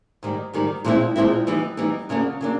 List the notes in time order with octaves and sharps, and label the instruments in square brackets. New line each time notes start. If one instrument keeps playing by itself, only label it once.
[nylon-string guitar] G#2 D#3 G3
G#2 D#3 G3
A#2 F3 G#3 C4 E4
A#2 F3 G#3 C4 E4
E3 G3 B3 D#4
E3 G3 B3 D#4
F2 C#3 F#3 A#3 D4
C#3 F#3 A#3 D4